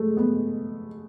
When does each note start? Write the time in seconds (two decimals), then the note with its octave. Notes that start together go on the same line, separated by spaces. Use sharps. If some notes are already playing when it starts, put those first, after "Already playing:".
Already playing: G#3 A3
0.17 B3